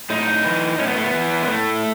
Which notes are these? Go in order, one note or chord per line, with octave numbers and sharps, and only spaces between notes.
A2 D#4
E3
A2 C#4
B3
A3
B3
E3
G#3
A2 A3